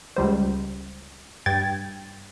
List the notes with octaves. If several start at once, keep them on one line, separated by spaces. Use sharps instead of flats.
C#2 G3 C5
G2 G5 G#6 A6